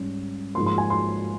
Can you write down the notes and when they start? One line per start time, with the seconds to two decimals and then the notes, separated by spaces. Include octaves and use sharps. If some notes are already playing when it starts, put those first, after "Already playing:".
Already playing: G#2 G3 C#4
0.55 G#2 F3 A#3 C6
0.66 C6
0.78 G#5
0.90 C6